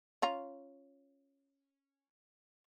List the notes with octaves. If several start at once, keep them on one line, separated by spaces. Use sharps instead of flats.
C#4 F4 A#5